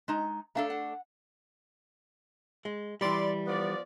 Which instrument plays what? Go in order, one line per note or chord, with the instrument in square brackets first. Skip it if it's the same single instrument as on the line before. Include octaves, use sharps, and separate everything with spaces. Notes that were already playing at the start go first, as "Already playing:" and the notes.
[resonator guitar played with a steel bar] G#3 D#4 A#5
[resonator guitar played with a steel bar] A3 D4 A4 [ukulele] E5 F5 A#5
[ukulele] F#5
[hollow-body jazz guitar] G#3
[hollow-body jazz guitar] E3 G3 [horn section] D5 C6
[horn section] F3 B3 D5